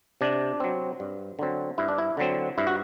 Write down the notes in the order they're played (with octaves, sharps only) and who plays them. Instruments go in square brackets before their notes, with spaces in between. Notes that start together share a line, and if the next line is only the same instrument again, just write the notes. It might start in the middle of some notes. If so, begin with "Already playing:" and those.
[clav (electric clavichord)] C3 D4
F#3 C4
G2
D3 F#3 C4
G2 E4
D4
E4
D3 F#3 C4
G2 E4
F#4